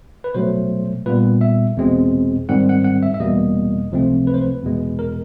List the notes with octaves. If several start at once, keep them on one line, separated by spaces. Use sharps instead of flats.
B4
B2 F#3 A3 C5
A#2 G3 B3 B4
E5
E2 B2 G#3 C4
G#2 D#3 G3 C4 F#5
F#5
F#5
E5
E5
E2 B2 G3 A#3 D#5
C#2 C3 F3 A3 C4
B4
C5
B4
E2 B2 G#3
A#4